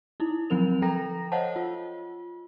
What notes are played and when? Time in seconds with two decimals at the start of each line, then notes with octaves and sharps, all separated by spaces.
0.20 D#4 E4
0.50 D3 F3 F#3 C4 A#4 F7
0.82 F3 A4 G5 A#5 A#6
1.32 C5 C#5 D#5 F5 F#5 A5
1.56 F4